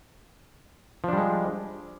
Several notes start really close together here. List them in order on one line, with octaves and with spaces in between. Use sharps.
F3 D4 G3 G#3